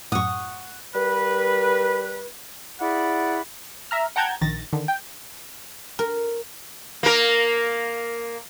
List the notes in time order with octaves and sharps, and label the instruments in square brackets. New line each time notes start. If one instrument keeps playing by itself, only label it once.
[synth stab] F#2 A2 [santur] F#5 [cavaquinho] C#6 D#6
[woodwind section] G3 A#4 B4
E4 G#4 D5 F#5 B5
[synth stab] E5 A#5 F6
F#5 G5 A5 A#5 G6 G#6
A#1 D#3 A6 A#6
D3 D#3
G5
[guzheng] A#4
[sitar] A#3 A#4